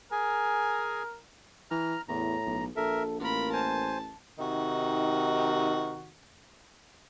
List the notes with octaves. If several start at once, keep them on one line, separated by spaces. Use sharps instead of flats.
G#4 A#4 G#5
E3 A#5 F6
E2 A2 A#5
B1
A#1 A4 A#4 E5
A1 A#3 F4 A#4 B5
C5 G#5 A5
C3 D#3 D#4 F#4